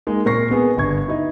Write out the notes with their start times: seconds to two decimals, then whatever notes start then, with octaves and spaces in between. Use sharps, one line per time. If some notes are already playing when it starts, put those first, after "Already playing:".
0.07 G#3 A#3 D#4
0.25 A#2 A#4 C#6 A#6 C7
0.50 B2 B3 G#4
0.77 G1 G2 C#6 G#6
1.08 D#4 E4